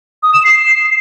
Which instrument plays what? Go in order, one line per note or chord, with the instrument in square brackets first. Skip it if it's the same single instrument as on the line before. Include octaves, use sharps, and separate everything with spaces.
[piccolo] D#6
E7
C7